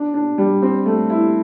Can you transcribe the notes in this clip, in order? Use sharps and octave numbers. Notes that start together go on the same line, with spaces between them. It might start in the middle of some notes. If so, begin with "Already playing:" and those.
Already playing: D4
D4
G3
C4
A3
E4